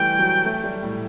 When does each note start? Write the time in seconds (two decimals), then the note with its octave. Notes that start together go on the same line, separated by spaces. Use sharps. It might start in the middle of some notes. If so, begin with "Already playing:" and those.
Already playing: E3 G3 A3 G5
0.19 F#3
0.45 A3
0.64 G3
0.83 A2